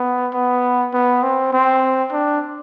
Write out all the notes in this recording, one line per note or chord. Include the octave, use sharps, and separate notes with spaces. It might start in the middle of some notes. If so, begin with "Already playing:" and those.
Already playing: B3
B3
B3
C4
C4
D4